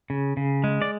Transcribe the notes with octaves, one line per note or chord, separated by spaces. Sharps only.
C#3
C#3
G#3
D5